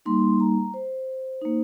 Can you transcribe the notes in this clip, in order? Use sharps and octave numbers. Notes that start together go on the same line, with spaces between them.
G3 A#3 D#4 C6
A#5
C5
A#3 D#4